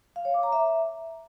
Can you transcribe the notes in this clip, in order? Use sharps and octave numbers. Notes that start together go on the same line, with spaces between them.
F5
C#5
D6
A#5
E5